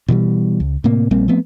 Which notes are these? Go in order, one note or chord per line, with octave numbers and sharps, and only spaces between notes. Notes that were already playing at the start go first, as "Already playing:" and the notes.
B2 E3 F#3 G3
C#2
A2 C3 A#3
A#1 G3 A#3 C4
F3 A3 B3 C4